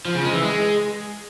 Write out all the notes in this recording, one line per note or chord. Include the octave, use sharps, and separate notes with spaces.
F3
C#3
G#3
E3
G#3